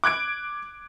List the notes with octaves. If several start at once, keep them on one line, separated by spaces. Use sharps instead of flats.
D6 F#6 G#6 D7